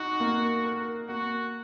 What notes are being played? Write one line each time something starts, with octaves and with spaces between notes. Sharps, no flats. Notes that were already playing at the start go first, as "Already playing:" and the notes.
Already playing: D#4 F#4
A#3
A#4
A#3 F#4